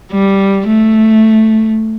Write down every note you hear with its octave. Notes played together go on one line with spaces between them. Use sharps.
G3
A3